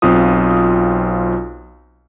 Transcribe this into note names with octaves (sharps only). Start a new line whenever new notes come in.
B1 C4 F4 D#6